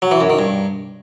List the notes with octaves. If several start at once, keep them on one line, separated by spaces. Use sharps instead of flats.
F#3
E3
F#2
D#3
G2